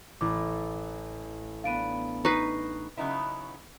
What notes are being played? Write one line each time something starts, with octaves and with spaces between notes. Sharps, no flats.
A1 E4 D6
B3 D4 F5 D7 D#7
D#4 B4 C#6 C7
C#3 F#3 B3 D#4 E4